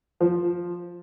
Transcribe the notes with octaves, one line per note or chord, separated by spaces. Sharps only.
F3